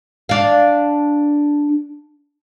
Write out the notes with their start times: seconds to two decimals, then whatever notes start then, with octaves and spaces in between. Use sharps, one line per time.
0.29 D4 F5